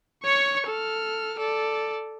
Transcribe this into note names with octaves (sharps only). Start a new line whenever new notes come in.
C#5 C#6
A4 F6
A4 D5